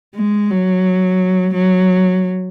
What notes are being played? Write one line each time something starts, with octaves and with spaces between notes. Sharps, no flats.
G#3
F#3
F#3